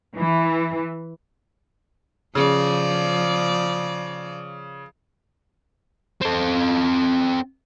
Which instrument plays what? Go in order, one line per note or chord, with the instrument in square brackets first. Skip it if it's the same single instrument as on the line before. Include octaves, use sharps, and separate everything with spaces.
[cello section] E3
[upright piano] C#3 [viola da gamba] F3 D5
[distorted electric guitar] C4 A4